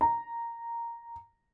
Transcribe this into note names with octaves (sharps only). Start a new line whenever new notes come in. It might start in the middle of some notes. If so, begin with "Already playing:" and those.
A#5